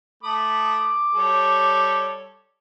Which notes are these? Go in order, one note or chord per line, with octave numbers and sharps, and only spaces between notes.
A3 B5 D6 D#6
G3 A4 C#5